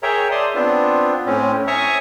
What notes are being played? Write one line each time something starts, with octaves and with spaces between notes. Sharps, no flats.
G#4 A#4 C#5 E5 G5 A#5
D5 A5 C6 D#6
B3 C4 D4 F4
A2 C4 C#4
E5 G#5 A#5 C#6 D#6